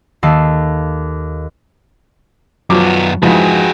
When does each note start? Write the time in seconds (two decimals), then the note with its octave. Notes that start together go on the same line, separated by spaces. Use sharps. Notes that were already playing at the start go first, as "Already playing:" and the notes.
0.23 D#2 D#3 A4 F5 A5 C7
2.70 F#2 F3 F#3 B3 D6
3.22 F2 G#2 E3 F#4 G#4